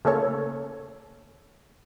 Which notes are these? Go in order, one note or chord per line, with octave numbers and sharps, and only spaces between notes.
C#3 A3 A#3 A4 C#5